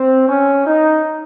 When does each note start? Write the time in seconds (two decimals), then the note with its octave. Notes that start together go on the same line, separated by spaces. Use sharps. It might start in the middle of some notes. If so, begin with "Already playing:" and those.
Already playing: C4
0.29 C#4
0.67 D#4